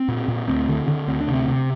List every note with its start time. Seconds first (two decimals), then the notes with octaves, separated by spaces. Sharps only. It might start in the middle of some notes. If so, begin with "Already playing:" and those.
Already playing: C4
0.08 A#2
0.28 A#2
0.48 D2 C4
0.68 D3
0.88 D3
1.08 D2 C4
1.20 D4
1.28 C3
1.33 C4
1.48 C3